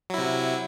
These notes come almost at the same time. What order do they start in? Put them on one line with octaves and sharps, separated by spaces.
F#3 E4 C3